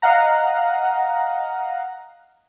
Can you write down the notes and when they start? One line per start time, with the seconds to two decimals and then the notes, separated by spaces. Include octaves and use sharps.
0.02 D#5 F5 F#5 A#5